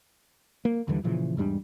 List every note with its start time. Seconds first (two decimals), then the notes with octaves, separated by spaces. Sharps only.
0.65 A#3
0.88 D#2 D3 E3 G3
1.03 A#2 C#3 E3 F3
1.37 E2 G#2 G3 D4